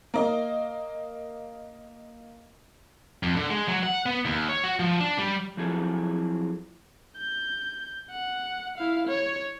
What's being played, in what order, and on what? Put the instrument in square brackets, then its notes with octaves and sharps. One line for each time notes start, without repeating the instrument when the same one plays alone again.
[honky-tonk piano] A#3 D#5
[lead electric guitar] F2
D3
G#3
F#3
F#5
B3
D#2
C#5
F#4
F3
D4
G3
[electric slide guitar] F3 F#3 C4 E4 G#4 A4
[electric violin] G6
F#5
E4 F5
C#5